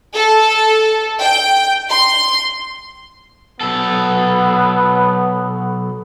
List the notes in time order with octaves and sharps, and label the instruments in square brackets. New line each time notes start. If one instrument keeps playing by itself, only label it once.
[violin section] A4
G5
C6
[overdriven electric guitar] B1 A4 [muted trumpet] B3